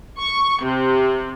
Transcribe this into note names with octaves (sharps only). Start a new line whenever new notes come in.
C#6
C3